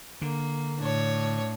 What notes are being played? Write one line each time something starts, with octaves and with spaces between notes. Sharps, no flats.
D3 A#3
A2 D4 C#5